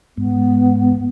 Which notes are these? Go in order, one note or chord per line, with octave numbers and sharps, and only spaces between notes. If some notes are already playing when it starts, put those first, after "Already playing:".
G#2 B3